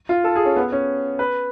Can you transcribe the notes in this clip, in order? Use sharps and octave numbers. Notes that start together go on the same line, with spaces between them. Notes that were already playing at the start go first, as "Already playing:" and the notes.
F4
A4
G#4
C#4
B3
C#4
B4